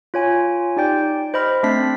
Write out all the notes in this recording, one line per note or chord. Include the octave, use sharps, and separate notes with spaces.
F4 C#5 G#5
D#4 G4 D5 G5 G6
C5 D#5 B5 F6
A3 C4 D4 A6 B6 C7